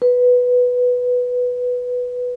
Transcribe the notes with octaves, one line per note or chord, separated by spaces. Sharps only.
B4